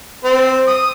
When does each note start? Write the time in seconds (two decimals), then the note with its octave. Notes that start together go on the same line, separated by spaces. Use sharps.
0.24 C4
0.68 D#6